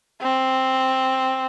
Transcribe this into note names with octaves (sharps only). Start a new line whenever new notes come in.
C4